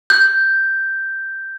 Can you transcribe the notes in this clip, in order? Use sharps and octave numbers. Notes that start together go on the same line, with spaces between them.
G6